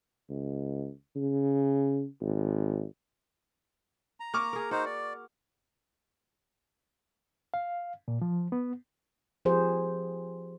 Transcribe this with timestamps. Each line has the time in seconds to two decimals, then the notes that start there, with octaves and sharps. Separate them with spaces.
0.29 C#2
1.15 C#3
2.21 G#1
4.20 A#5
4.34 A#3 C#6 D6 F6
4.53 G#4 A#4
4.71 D#4 F#4 C5
4.85 D5
7.54 F5
8.08 A#2
8.22 F3
8.52 B3
9.45 F3 G4 G#4 C5